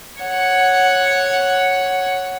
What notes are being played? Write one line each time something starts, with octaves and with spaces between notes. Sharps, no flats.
C#5 F#5